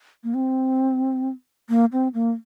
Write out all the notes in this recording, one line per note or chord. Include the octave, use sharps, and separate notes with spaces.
A#3
C4
A#3
C4
A#3